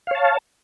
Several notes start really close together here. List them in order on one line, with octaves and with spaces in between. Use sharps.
F5 C#5 A5